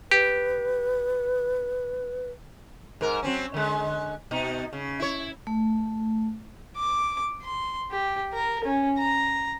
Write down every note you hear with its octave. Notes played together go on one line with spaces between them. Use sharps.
G4 B4
G#2 A#4
F#3 C4 C#4
D3 G#3
B2 D#4
C#3
E4 C#5
A3
D6
C6
G4
A#4
C#4
A#5